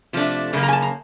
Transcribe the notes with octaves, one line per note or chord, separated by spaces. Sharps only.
C3 F3 A3 D4
F#2 C#3 A#3
A#5
G#5
A5
A#5